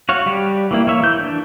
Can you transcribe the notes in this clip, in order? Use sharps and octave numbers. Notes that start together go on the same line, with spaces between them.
F#4 C#5 F5
G3 G4
E3 A#3 E4
A#3 C#5 E5
E3 G6
D4